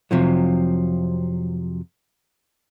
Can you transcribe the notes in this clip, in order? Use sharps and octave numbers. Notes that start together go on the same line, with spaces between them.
F2 C3 F3 F#3